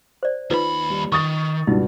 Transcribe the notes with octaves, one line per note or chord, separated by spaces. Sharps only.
C5 D5
D#2 D#4 F4 B4 B5
G3
D#3 C#6 D#6 A6
C#2 G2 B2 D#4